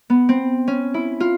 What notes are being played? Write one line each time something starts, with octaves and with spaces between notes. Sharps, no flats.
B3
C4
C#4
E4
F4